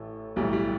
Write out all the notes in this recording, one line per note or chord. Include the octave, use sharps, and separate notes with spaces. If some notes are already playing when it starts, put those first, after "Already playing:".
Already playing: A1 A2 E3 A3
B1 A2 E3 G3
G3